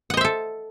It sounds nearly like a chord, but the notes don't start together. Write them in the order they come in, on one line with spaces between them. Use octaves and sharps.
F#5 D#5 C5 E5 A4